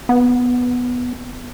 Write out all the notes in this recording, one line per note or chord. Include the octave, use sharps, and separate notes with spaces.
B3